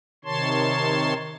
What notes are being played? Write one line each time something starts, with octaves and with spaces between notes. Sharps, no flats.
C3 D#3 C#5 A5 C6